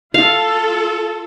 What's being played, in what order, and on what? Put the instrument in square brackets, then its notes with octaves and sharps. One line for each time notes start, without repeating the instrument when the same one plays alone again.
[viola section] F4 A4 [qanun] F5